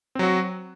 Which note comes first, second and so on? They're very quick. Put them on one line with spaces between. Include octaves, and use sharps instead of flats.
C4 F#3 F#4